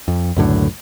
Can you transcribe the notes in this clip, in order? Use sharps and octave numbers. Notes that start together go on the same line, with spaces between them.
F2
C#2 F#2 A2 D3